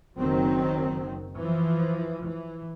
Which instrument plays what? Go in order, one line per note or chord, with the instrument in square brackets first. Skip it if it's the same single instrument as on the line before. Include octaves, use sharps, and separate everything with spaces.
[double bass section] F#1 D#3 F#3 C4
E3 F3
E3